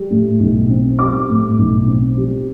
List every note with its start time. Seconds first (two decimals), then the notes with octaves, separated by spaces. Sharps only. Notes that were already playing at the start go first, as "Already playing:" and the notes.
Already playing: G3
0.10 A2
0.40 B1
0.70 C4
0.99 G3 D6
1.29 A2
1.58 B1
1.88 C4
2.18 G3